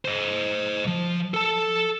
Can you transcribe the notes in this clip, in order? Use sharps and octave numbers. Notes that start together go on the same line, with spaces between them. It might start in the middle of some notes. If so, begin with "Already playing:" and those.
C5 D#5
F3
A4 A5